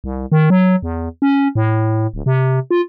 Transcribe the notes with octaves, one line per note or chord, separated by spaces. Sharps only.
C2
D#3
F#3
E2
C#4
A2
D1
C3
F4